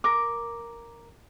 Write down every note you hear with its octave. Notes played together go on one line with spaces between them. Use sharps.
A#4 D6